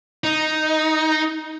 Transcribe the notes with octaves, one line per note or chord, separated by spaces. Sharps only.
D#4